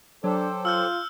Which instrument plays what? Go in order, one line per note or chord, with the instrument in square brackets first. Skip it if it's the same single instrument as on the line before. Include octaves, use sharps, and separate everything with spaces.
[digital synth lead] F#3 [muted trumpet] D4 [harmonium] G4 A4 C5
[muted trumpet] F4 [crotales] E6 F6 G6